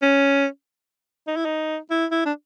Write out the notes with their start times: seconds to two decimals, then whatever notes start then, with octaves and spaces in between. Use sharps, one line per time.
0.02 C#4
1.27 D#4
1.36 E4
1.45 D#4
1.91 E4
2.11 E4
2.26 D4